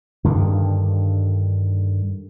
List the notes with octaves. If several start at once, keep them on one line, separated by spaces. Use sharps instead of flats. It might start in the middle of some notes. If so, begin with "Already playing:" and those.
G2 D3 D#3